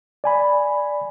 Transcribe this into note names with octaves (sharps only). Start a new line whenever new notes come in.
D5 G#5 B5